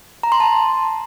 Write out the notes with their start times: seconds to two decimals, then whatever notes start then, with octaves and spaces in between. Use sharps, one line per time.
0.23 A#5
0.32 C6
0.40 A5